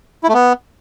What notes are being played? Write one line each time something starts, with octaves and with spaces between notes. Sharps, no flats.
E4
A3
B3